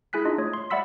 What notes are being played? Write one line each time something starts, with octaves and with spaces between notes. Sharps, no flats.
E4 G#4 G#5 F#6 B6
D4 D#4 F4 D#5
A3 C#5 D#6
C6
D5 E5 F#5 B5 E6 B6